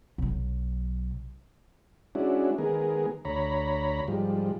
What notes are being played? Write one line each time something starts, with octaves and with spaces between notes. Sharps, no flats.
B1 F#3
G#3 C#4 D4 E4 F#4
D#3 G#3 B3 G#4 A#4
D2 C#5 A#5 B5
G#2 F3 G3